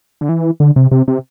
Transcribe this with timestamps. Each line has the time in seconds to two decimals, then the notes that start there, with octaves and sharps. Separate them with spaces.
0.21 D3
0.29 E3
0.60 D3
0.76 C3
0.91 C3
1.08 C3